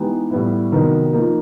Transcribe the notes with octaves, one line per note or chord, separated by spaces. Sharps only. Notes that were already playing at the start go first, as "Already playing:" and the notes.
Already playing: E3 G#3 B3 D#4 G4
A2 E3 G3 B3 E4
C3 D#3 F#3 B3 D#4
F3 A#3 D#4